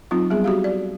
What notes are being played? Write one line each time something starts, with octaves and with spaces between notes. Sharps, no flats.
F#3 C4 D#4 F4
G3 B3 G#4
F#4 G4 F5
D5